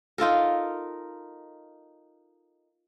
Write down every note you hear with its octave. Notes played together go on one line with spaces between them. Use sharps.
D#4 F4 A4 A#4